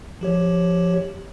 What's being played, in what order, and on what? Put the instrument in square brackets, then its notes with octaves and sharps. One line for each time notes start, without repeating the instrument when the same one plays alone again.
[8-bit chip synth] F3 G4 C#5